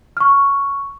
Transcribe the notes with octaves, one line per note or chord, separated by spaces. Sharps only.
C#6 F6